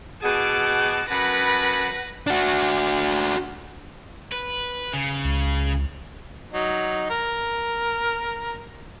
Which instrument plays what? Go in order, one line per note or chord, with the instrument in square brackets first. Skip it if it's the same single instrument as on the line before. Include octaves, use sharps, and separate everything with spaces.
[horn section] B2 G#4 [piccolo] F#5 [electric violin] A5 D6
[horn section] F#2 A5 B5 [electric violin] B4 A#6 [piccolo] F#5
[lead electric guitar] D4 F#4
[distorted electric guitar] B4
C#3
[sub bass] C#2
[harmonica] F#3 D#4
A#4